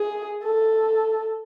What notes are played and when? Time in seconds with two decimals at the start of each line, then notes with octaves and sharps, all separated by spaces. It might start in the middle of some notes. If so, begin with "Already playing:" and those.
Already playing: G#4
0.43 A4